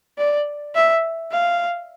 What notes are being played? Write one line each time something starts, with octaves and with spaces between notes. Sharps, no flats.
D5
E5
F5